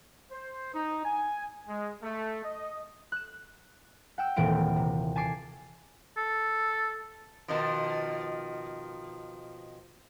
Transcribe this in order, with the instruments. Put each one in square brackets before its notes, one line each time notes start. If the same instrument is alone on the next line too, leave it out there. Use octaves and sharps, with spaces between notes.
[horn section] C5
D#4
G#5
G#3
A3
D#5
[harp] F#6 E7
F#5 G5 E6
D#1 A#1 A#2 E3 C4 D7
C3
G#5 A5 D6 C7
[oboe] A4
[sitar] B2 D#3 F3